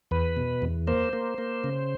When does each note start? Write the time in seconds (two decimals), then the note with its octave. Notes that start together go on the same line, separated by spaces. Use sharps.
0.11 E2 B4
0.37 B2
0.62 E2
0.87 A#3 C5
1.13 A#3
1.38 A#3
1.64 C#3